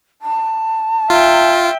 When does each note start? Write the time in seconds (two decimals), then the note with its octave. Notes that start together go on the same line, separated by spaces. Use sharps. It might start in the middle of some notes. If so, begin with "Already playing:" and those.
0.22 A5
1.10 F4 E5 G5